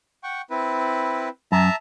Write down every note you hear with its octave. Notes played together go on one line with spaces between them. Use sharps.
F#5 G5 C#6
C4 E4 B4
F#2 E5 A5 A#5